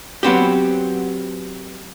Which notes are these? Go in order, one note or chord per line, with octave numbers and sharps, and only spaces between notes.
F#3 B3 C4 G4